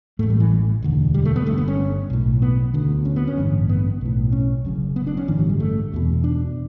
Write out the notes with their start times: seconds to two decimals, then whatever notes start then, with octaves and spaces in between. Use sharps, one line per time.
0.19 A2 A3
0.23 A1
0.30 G3
0.40 E3
0.82 E1 D2 D3
1.14 G3
1.25 A3
1.36 B3
1.46 G1 G2 D3 A3
1.58 B3
1.68 C#4
2.10 B1 A2
2.42 B3
2.74 D2 D3
3.05 C#4
3.16 B3
3.27 C#4
3.38 A1 G2 D3
3.69 B3
4.01 B1 A2
4.32 C#4
4.65 F#1 F#2 C#3
4.96 B3
5.07 D4
5.17 C#4
5.28 A1 G2 D3 E3
5.39 F#3
5.49 G3
5.60 A3
5.92 E1 E2 B2
6.24 D4